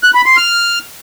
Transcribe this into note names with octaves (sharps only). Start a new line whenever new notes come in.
F#6
B5
C6
F6